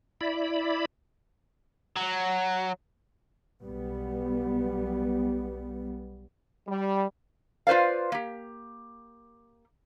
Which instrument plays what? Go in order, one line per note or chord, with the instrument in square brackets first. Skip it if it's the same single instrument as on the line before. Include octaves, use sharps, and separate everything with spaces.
[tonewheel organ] E4 D5 B5
[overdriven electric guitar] F#3
[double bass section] B1 G3 B3
[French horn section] G3
[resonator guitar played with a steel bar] F4 B4 C5 D5 F5
A#3 G4